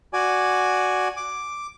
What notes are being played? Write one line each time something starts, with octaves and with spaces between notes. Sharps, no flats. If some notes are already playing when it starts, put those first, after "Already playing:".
F#4 D5 G#5
D6